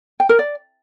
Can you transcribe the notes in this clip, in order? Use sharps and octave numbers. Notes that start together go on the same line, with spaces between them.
G5
A#4
D5